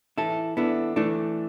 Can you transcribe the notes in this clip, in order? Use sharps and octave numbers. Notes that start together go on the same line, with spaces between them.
E3 E4 A4
B3 D4 E4 A4
E3 A3 D4